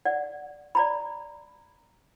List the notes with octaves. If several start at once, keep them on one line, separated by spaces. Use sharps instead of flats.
D5 F#5
D5 A#5 B5